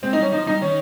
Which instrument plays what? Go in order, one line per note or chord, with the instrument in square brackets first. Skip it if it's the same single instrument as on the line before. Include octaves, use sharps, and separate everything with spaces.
[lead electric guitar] G#3 [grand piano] C4
[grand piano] D#4
[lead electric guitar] G3 [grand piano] C#4
[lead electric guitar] F3 [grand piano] D#4
[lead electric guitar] G3 [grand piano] D#4
[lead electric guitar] D#3 [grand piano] C#4